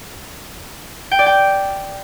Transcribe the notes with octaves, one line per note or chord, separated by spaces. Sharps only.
G5
D5
G5